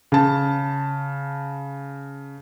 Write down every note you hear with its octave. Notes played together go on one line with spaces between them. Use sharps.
C#3 A5